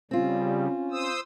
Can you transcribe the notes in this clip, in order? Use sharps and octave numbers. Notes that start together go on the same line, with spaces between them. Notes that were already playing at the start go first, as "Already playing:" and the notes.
C#3 G3 C4 C#4 F4
C5 D#6 E6